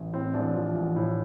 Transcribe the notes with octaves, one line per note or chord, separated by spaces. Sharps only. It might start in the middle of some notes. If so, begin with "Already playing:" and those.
Already playing: A1
A2 C4
A1 D4
F3
A1
A2